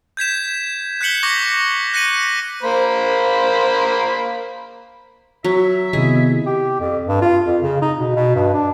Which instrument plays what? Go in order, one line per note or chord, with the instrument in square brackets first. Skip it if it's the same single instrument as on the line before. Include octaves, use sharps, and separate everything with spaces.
[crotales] G6 G#6 B6 E7
F#6 G6 B6 C#7 F#7 G7
C#6 D6 G6 A#6
F#6 A#6 C#7 D#7 F#7
[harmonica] A#3 C5 B5
[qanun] F#3 [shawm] E5
[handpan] C3 D#3 [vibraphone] B3 E4 D#5 [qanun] G#4
[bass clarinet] G4
F2
G2
F4
F2
C#3
D#4
B2
B2
G2
D4